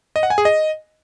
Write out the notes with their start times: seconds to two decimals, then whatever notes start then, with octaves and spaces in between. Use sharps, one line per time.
0.16 D#5
0.23 F#5
0.30 G#5
0.38 G#4
0.45 D#5